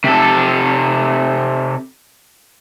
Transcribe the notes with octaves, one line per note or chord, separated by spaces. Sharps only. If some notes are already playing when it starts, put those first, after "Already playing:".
C3 A4